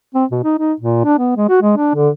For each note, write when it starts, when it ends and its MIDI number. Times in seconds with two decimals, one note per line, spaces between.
0.15 0.25 60
0.32 0.41 47
0.44 0.54 63
0.59 0.73 63
0.80 1.01 46
1.04 1.17 62
1.18 1.34 59
1.37 1.47 56
1.49 1.57 66
1.62 1.75 56
1.77 1.92 62
1.95 2.10 50